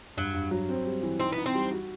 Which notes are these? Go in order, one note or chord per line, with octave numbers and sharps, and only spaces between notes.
G2 F#3
G2
F#3
C4
G3
E3
C4 D#4
B3
D#4
C4
G3
F#4